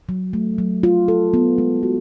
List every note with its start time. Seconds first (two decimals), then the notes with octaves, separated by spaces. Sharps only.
0.09 F#3
0.33 A3
0.58 F#3
0.83 F4
1.08 A4
1.34 B3
1.58 G#3
1.83 F#4